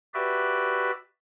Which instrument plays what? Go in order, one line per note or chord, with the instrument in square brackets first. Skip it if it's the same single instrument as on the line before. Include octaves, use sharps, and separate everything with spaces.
[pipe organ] F#4 G4 B4 D5 E5